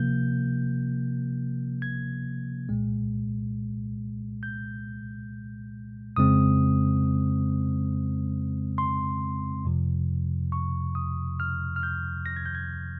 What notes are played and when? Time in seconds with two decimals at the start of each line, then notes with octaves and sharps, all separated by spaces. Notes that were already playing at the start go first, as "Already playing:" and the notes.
Already playing: C3 F3 A#3 G6
1.82 G#6
2.69 C2 A#2 G#3
4.43 G6
6.16 F2 C#3 G#3 C4 D#6
8.78 C6
9.65 F2 C3 F3
10.52 C#6
10.95 D#6
11.40 F6
11.76 F6
11.83 G6
12.26 A#6
12.36 G#6
12.46 G6
12.55 G#6